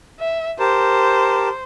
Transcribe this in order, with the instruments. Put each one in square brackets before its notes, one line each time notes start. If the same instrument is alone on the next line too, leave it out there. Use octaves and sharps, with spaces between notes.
[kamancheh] E5
[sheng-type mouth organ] G4 A#4 A5 [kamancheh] C5